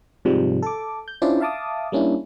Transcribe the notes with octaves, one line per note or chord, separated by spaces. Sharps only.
G#2 C3 F3 G3 G#3
A4 D6
G6
C#4 D4 E4 F4 C5 D5
E5 F5 A5 D6 D#6
G3 A#3 C#4 D4 E4